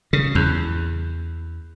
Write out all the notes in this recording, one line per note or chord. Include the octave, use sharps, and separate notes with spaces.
C#3
E2